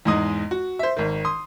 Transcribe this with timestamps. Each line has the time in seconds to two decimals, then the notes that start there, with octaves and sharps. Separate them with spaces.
0.05 E2 G#2 G#3 D#4 D#6
0.51 F#4
0.79 C5 E5
0.97 G#1 D#3
1.25 C6 D#6